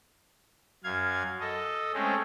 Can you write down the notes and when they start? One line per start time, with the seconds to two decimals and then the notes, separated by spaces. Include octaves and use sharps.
0.84 F#2 F5 G#6
1.40 A4 D#5
1.94 G#3 A3 C4 C#4